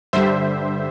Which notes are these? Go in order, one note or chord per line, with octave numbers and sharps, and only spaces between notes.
G2 D3 G3 C5 E5